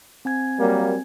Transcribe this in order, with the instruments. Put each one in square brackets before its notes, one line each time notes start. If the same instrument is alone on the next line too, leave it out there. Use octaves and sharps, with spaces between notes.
[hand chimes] C4 G#5 G#6
[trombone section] F#3 G3 A#3